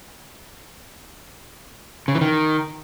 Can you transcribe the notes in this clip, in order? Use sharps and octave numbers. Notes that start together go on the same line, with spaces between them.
C#3
E3
D#3